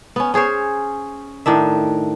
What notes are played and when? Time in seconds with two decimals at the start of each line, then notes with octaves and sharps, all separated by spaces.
0.16 B3 C#4
0.34 C#4 G#4 C5 C#5
1.46 A2 D#3 D4 E5